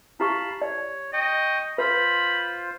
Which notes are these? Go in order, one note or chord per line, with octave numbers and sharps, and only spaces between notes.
E4 G4 F5 A5 B5 C#6
C#5 D5
D#5 G5 C#6
F4 B4 C5 B5